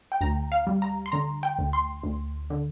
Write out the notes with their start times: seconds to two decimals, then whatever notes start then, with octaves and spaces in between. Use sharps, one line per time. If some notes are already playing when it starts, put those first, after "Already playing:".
0.12 G5
0.21 D2 A#5
0.52 F5
0.67 G3
0.82 A#5
1.06 C6
1.12 D3 A#5
1.43 G5
1.59 D2
1.73 C6
2.03 D2
2.50 D3